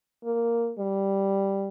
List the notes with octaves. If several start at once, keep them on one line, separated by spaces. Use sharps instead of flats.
A#3
G3